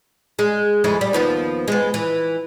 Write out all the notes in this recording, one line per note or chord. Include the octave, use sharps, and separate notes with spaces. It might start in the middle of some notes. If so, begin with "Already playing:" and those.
G#3
F2 G#3 E4
G3
D#2 F3 B3
G#3 B3
E3